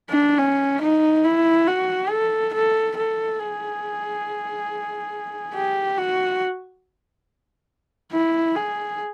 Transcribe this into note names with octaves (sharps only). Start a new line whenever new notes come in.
D4
C#4
D#4
E4
F#4
A4
A4
A4
G#4
G4
F#4
E4
G#4